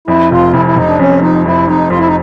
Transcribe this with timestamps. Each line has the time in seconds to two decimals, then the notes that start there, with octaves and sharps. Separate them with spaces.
0.08 F2 E4
0.31 F1 F4
0.54 F1 E4
0.66 E4
0.76 F1 D#4
0.88 D4
0.99 F2 C#4
1.22 F3 D#4
1.45 F2 E4
1.68 F2 D#4
1.90 F2 F4
1.99 E4
2.07 D#4